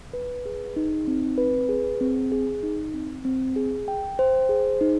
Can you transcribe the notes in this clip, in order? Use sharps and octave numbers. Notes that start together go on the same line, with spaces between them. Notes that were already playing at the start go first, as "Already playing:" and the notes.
B4
G#4
D#4
C4
B4
G#4
C4
G#4
D#4
C4
C4
G#4
G5
C5
G#4
D#4